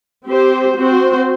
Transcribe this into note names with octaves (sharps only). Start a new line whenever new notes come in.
C4 G4 C5
C4 F#4 C5